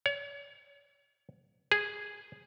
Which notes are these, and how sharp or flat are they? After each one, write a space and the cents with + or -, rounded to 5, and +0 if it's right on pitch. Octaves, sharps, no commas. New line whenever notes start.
C#5 +35
G#4 -5